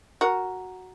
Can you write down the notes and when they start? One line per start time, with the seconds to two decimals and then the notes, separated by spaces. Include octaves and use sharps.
0.21 F#4 A#4